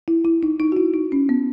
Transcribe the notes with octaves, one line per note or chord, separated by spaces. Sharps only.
E4
E4
D#4
D#4
F#4
E4
D#4
C#4
B3